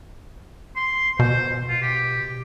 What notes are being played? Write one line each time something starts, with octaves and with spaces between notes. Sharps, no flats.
C6
B2 C5
F4
G4